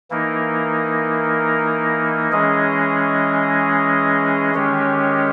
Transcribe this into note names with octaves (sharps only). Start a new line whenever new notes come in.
E3 A#3 D#4 A#4
E3 G#3 C#4 G#4 D#5
D#3 G#3 C#4 G4 C#5